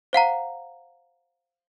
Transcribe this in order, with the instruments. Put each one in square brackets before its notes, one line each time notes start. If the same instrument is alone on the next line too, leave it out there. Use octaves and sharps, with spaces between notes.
[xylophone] C5 F5 F#5 A#5